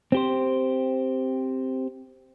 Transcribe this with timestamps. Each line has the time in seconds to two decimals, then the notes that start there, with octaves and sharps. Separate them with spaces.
0.12 C4 G4 C5